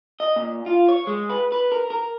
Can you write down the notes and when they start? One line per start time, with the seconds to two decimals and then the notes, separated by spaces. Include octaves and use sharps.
0.20 D#5
0.36 A#2
0.66 F4
0.88 C#5
1.07 G#3
1.29 B4
1.52 B4
1.72 A#4
1.90 A#4